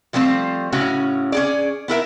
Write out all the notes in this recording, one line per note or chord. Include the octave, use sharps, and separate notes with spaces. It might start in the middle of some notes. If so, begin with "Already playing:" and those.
F3 G3 A3 C4 C5
A2 C#3 C#4 F#4
C#4 G#4 D5
B3 E4 A#4 E5